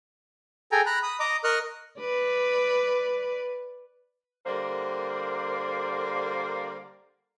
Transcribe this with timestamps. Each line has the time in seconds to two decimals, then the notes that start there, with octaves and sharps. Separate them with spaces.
0.72 G#4 A4 G5 G#5 A#5
0.86 A#5 B5 F#6
1.03 B5 D#6
1.20 D#5 A#5 D6 D#6
1.44 A#4 D#5 C#6 D#6 F6 F#6
2.00 B4 D5
4.46 D3 G3 A#3 A#4 C5 D5